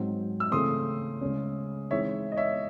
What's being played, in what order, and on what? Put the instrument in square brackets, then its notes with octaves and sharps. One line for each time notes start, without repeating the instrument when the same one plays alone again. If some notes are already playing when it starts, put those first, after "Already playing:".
Already playing: [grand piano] G#2 F#3 C4
[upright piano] E6
[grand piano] C#3 E3 A3 C4 [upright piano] C6 D#6
[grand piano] C#3 G#3 C#4
[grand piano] E3 G#3 C4 D#4 [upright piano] C#5 E5
[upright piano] D#5
C#5 E5